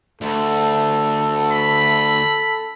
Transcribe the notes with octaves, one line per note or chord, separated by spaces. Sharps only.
D2 A4
B5